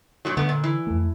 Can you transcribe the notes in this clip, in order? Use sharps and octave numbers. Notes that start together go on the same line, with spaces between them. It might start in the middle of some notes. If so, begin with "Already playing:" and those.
G2 A#2 F#3
G2 D3 A3 B3
A#2
E3
F2 A3